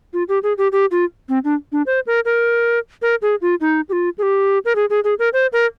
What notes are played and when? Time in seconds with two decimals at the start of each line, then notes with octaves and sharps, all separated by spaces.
0.13 F4
0.29 G4
0.43 G#4
0.58 G4
0.72 G4
0.91 F4
1.29 C4
1.44 D4
1.72 D4
1.87 C5
2.07 A#4
2.25 A#4
3.02 A#4
3.22 G#4
3.42 F4
3.61 D#4
3.89 G4
3.93 F4
4.18 G#4
4.23 G4
4.65 A#4
4.76 G#4
4.90 G#4
5.04 G#4
5.19 A#4
5.33 C5
5.53 A#4